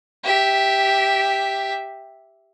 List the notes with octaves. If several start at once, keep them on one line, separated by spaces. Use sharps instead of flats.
G4 E5